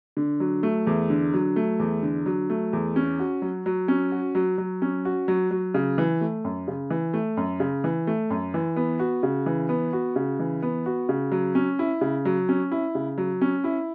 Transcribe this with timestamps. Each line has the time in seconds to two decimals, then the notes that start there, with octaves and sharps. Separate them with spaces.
0.17 D3
0.40 F#3
0.63 A3
0.87 E2
1.10 D3
1.34 F#3
1.56 A3
1.80 E2
2.03 D3
2.26 F#3
2.50 A3
2.73 E2
2.96 C#4
3.19 F#4
3.42 F#3
3.66 F#3
3.88 C#4
4.12 F#4
4.35 F#3
4.58 F#3
4.82 C#4
5.05 F#4
5.28 F#3
5.51 F#3
5.74 C#3
5.98 E3
6.21 A3
6.45 F#2
6.68 C#3
6.90 E3
7.14 A3
7.37 F#2
7.60 C#3
7.84 E3
8.07 A3
8.30 F#2
8.54 E3
8.76 B3
8.99 F#4
9.23 C#3
9.46 E3
9.69 B3
9.93 F#4
10.16 C#3
10.39 E3
10.63 B3
10.86 F#4
11.09 C#3
11.32 F#3
11.55 C#4
11.79 E4
12.01 C#3
12.25 F#3
12.49 C#4
12.72 E4
12.95 C#3
13.18 F#3
13.42 C#4
13.64 E4